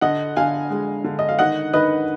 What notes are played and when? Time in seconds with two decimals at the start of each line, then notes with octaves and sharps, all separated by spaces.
0.01 D3 D#5 F#5
0.36 D3 F5 G#5
0.70 G#3
1.04 D3
1.19 D#5
1.29 F5
1.39 D#3 D#5 F#5
1.73 D#3 B4 D#5